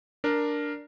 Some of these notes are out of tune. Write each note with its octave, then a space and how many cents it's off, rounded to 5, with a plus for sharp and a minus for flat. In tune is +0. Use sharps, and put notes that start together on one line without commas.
D4 +0 A#4 +0